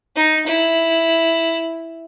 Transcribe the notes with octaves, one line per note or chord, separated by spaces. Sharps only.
D#4
E4